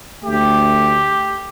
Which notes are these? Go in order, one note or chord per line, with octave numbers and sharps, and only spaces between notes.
D2 D3 A3 G4